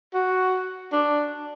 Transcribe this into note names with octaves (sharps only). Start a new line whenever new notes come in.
F#4
D4